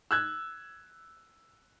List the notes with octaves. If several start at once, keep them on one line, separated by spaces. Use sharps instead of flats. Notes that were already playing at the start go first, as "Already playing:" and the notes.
E6 F#6 G#6